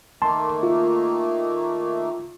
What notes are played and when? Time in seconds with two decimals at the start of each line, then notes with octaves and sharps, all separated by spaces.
0.22 D#3 A3 A#3 A5 C6
0.63 F4